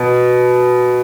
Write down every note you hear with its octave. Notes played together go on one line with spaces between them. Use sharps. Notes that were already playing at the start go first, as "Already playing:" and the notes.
Already playing: B2